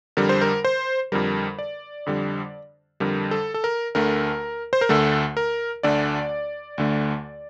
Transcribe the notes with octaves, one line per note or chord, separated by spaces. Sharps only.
F2 D3 G3 A#4
C5
A#4
C5
F2 D3 G3 A#4
D5
F2 D3 G3
F2 D3 G3 A#4
A4
A4
A#4
D2 D3 A3 A#4
C5
A#4
D2 D3 A3 A4
A#4
D2 D3 A3 D5
D2 D3 A3